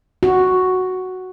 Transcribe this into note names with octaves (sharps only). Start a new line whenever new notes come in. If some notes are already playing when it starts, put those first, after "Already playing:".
F#4